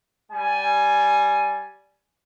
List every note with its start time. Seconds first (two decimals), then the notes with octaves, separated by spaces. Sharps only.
0.31 G3 G#5